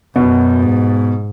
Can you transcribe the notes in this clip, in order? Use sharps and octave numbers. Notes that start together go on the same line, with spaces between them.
F#2 B2
G#2